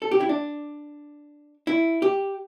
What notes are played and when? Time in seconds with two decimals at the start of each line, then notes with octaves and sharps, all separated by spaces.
0.02 A4
0.11 G4
0.21 E4
0.29 D4
1.67 E4
2.02 G4